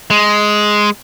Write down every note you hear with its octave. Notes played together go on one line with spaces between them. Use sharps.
G#3